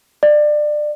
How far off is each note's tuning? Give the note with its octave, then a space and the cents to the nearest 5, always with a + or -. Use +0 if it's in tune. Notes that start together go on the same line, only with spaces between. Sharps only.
D5 +25